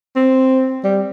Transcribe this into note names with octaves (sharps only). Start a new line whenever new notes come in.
C4
G3